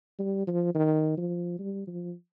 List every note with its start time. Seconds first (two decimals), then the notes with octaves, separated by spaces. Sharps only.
0.19 G3
0.47 F3
0.75 D#3
1.17 F3
1.59 G3
1.87 F3